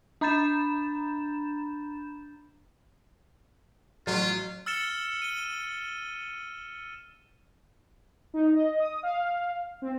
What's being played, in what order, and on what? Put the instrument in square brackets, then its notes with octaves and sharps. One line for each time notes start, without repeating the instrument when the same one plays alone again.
[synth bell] D4 A#5 B5 G6 A6 E7
[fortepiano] A1 C6 C#6 [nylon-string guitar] F#3 [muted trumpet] F4
[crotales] E6 F6 A6 C#7 E7 G7
D#7 G7
[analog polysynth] D#4
D#5
D#6
F5
C4